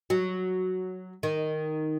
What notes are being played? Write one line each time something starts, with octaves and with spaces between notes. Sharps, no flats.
F#3
D#3